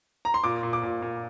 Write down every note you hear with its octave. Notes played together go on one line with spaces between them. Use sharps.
A#5
C6
A#2 D6
A#2
D6
A#2
A#2